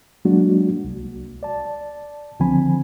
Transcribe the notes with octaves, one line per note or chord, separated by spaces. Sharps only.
F#3 G#3 A#3 D4 F#4
C2
D5 A5
C#2 D3 F3 C4 G#5 B5